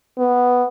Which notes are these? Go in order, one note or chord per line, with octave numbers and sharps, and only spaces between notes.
B3